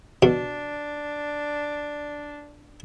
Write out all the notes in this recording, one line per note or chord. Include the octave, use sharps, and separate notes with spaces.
B2 D4